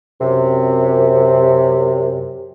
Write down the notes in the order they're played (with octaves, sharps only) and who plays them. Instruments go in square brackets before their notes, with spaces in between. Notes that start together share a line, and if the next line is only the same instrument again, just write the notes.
[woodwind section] F#2 C3